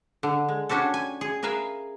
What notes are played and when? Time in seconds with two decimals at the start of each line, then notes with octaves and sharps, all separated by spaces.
0.23 D3
0.49 G#3
0.69 C#4 D4 F#4 G4 A4
0.94 G#5
1.21 G#4
1.43 G#4 A#4 B4 E5 F5